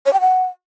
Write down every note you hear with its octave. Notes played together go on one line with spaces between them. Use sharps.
C#5
G5
F#5